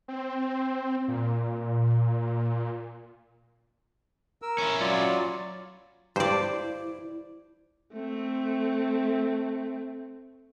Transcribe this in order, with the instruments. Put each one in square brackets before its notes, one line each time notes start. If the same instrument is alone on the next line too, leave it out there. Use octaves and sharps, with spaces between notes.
[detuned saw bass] C4
A#2
[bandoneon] A#4 E6
[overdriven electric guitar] C#4 E4
[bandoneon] F#3 F4 D5
[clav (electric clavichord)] G2 [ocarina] E4 [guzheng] C5 D5
[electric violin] A3 C4